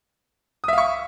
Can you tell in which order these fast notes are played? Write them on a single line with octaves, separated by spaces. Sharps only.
D#6 E5 F5 C#6